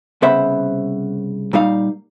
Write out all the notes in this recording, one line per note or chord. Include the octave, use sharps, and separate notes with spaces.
C2 C#3 B3 C5 E5 B5
A#2 G3 D#4 F5